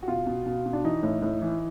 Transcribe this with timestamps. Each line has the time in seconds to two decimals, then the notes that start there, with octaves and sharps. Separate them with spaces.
0.03 F#4
0.08 B2 F4
0.27 B2
0.46 B2
0.66 B2
0.73 D4
0.84 E3 D#4
1.03 A2
1.22 A2
1.41 E3